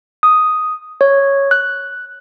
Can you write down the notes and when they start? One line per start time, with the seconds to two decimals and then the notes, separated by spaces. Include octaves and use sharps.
0.23 D#6
1.01 C#5
1.51 F#6